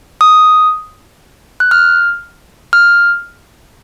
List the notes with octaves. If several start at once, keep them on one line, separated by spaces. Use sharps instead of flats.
D#6
F#6
F6
F6